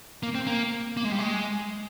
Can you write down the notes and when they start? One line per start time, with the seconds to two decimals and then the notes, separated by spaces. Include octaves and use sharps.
0.23 A#3
0.35 C4
0.47 A#3
0.97 A#3
1.04 G#3
1.12 G3
1.19 G#3